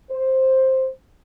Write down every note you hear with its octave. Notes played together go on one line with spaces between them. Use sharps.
C5